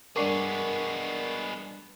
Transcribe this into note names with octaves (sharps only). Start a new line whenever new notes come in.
G2 G#3 B3 D4 A#4 C#6 D6 C7